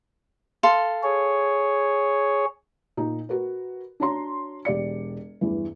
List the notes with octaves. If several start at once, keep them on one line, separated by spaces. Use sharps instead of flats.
A4 F5 C6
G#4 C#5
A#2 D#4
F#4 A#4 B4
D4 F#4 C#5 A#5 C6
E1 G4 D5 C#7
E2 G2 E3